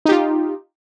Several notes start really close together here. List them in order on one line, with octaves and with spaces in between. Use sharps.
D#4 G4 F4